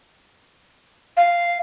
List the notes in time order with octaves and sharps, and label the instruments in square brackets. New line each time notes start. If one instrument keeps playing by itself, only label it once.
[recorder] F5